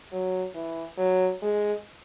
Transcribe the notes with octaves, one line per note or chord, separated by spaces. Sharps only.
F#3
E3
F#3
G#3